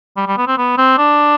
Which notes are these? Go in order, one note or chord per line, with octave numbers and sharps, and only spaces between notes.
G3
G3
B3
C4
B3
C4
D4